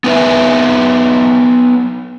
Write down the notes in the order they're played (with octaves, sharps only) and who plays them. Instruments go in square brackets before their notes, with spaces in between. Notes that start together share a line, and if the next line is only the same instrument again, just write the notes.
[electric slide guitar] B3 D#4 B4 E5